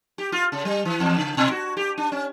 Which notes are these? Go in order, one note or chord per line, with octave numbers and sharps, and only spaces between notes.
G4
F4
C#3
G3
E3
E2
C#3
B2
F#4
G4
D4
C#4